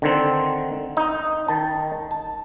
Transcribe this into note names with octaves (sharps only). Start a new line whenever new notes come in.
D3 D#3 C4
D#4
D#3 A5
A5